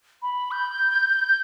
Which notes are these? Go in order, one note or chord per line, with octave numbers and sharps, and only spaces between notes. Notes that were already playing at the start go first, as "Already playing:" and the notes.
B5
G6